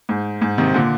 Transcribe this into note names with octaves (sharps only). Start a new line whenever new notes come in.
G#2
G#2
C3 D#3
A#2 D3